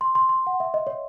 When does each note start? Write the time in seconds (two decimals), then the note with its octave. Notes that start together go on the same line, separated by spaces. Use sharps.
0.01 C6
0.15 C6
0.29 C6
0.47 F#5
0.60 E5
0.74 D#5
0.87 C#5